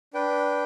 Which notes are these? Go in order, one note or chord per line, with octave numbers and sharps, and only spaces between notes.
D4 B4 G5